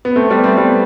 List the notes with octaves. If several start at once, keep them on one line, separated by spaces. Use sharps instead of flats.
B3
A3 C4
G3 B3
A3 C4
G3 B3